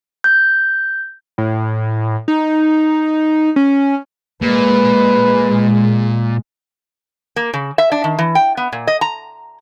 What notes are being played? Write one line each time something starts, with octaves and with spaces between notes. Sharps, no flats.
G6
A2
D#4
C#4
A#2 G#3 B4
A#3
C#3
E5
D4
D#3
E3
G5
B3
A#2
D#5
A#5